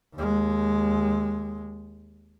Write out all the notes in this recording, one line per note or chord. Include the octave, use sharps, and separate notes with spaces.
D#2 G#3